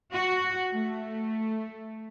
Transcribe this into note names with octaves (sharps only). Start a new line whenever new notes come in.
F#4
A3